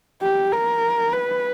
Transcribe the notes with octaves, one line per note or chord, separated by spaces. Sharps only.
G4
A#4
B4